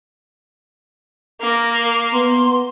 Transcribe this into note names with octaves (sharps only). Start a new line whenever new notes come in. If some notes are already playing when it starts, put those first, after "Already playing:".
A#3 A#4
B3 C6